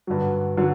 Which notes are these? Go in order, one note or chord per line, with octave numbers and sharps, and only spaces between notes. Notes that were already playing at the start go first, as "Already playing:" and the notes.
G2 D3 F#3
D3 F#3